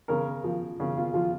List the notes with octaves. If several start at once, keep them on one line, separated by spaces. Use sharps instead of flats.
C#3 A#4
F3
C#3
F4
F3 F4